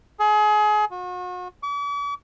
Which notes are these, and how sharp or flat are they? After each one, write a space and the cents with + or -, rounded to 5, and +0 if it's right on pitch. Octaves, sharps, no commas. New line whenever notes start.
G#4 +30
F#4 -40
D6 -45